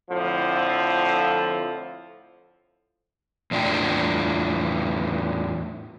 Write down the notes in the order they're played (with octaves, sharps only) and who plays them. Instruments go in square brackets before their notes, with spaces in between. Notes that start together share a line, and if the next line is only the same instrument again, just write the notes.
[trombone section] F2 A2 D3 F3
[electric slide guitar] E2 A2 D4 E4 F4 G5